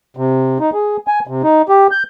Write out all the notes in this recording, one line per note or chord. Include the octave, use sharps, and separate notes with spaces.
C3
D#4
G#4
G#5
C3
D#4
G4
G6